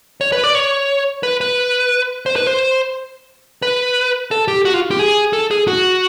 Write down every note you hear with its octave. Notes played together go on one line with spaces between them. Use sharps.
C#5
B4
D5
C#5
B4
B4
C5
B4
C5
B4
A4
G4
F#4
F4
G4
G#4
A4
G#4
F#4